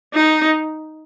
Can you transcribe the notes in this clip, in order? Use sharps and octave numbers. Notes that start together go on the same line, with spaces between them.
D#4